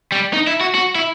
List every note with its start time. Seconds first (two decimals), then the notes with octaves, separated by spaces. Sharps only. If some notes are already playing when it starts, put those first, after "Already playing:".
0.12 G3
0.33 D#4
0.47 E4
0.61 F#4
0.75 F#4
0.95 E4